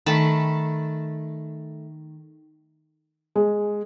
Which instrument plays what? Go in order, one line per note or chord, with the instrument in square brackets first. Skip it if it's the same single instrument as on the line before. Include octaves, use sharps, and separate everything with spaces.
[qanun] D#3 A3 A5 B5
[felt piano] G#3